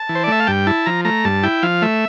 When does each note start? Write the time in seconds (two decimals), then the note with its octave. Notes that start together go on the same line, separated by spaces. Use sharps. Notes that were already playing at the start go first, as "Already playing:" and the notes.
Already playing: A5
0.09 E3
0.15 C5
0.24 D5
0.28 A3 E5
0.40 F5
0.47 G2 G5
0.67 E4 A5
0.86 F3 A#5
1.05 A3 A#5
1.24 G2 A5
1.43 E4 G5
1.63 F3 F5
1.82 A3 E5